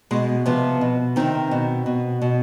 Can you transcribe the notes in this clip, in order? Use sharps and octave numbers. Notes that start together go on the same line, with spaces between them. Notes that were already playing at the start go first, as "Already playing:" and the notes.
B2 G#3
C3 F3 B3
B2
C3 D#3 C4
B2
B2
B2